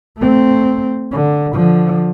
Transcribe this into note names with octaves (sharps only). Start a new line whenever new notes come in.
A3 C4
D3
D3 F3